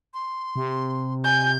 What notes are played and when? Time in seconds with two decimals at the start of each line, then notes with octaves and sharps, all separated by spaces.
0.14 C6
0.56 C3
1.25 G#5 G6